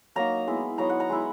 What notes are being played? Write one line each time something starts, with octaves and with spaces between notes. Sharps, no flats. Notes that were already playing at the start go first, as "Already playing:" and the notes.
F#3 A#3 D#4 A#5
G#3 B3 E4
F#3 B3 D#4 A#5
F#5
A#5
G#3 B3 E4